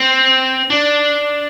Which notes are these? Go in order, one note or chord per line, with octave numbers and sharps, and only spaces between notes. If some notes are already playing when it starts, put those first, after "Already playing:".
Already playing: C4
D4